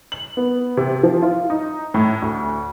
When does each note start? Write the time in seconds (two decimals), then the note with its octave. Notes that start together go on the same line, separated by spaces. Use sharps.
0.12 F#7
0.37 B3
0.77 C3
1.03 F3
1.22 F4
1.50 D#4
1.94 A2
2.22 D2